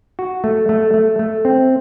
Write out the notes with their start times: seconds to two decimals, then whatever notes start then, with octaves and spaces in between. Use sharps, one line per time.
0.19 F#4
0.44 A3
0.69 A3
0.94 A3
1.19 A3
1.45 C4